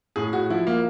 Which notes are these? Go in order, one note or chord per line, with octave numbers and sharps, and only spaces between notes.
A2 G#4
F#4
F3 E4
A#3